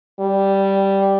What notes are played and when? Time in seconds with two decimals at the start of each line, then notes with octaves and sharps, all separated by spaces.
0.20 G3